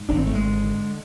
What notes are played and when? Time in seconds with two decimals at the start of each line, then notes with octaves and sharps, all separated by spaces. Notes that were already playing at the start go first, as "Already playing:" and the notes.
Already playing: G#2
0.09 G#1 D4
0.17 C4
0.26 G#1 A3
0.35 G#3
0.44 D3
0.61 D3